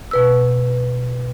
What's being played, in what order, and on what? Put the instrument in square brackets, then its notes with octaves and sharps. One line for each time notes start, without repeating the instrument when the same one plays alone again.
[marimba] B2 B4 E6